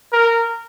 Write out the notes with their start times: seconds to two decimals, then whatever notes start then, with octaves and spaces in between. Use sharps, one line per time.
0.12 A#4